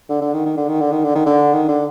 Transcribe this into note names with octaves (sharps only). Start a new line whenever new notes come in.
D3
D3
D#3
D#3
D3
D#3
D3
D#3
D3
D#3
D3
D#3
D3